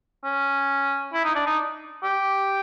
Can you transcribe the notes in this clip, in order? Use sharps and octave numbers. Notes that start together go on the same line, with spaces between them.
C#4
E4
D#4
D4
D#4
G4